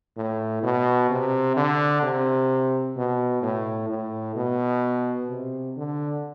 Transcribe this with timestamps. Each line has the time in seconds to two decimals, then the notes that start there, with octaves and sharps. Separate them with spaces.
0.17 A2
0.63 B2
1.10 C3
1.57 D3
2.03 C3
2.97 B2
3.42 A2
3.89 A2
4.36 B2
5.29 C3
5.77 D3